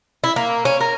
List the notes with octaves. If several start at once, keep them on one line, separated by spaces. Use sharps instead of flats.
E4
A#3
C#4
A#4